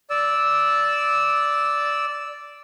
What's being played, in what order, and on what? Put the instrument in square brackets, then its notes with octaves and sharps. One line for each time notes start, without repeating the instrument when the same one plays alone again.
[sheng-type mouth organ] D5 E6